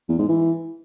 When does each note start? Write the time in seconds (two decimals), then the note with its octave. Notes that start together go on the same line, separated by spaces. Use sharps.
0.09 E2
0.19 G#2
0.29 E3